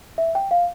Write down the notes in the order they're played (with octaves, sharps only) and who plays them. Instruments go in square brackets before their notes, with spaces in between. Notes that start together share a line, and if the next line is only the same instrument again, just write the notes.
[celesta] E5
G5
F5